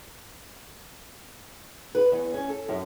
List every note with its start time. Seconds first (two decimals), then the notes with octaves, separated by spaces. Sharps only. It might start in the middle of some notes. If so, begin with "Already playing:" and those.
1.95 B4
2.12 E2
2.34 C#4
2.49 A4
2.69 F#2